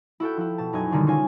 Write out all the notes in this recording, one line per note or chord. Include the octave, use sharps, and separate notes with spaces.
E4 F#4 A4 G5
F3 E4
B2 A5
F#2 D#4 G#4 D#5 G#5 G#6
B2 D3 D#3 G3
C#4 D#4 F4 F5 G#5